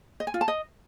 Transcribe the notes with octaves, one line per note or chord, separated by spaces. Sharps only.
D#5
G#5
F4
A5
D#5